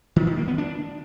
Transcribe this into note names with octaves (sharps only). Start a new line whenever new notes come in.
D#3
D#3
A#3
B3
D4